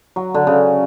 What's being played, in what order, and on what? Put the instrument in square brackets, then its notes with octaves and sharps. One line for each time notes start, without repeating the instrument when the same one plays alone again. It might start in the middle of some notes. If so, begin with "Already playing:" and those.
[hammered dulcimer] F#3
D3
C#3